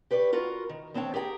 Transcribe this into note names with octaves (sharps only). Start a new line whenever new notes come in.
G4 B4 C#5 D5
F4 F#4 A#4
D#3
E2 C4 D4 C#5 G5
G4 G#4 A#4 G5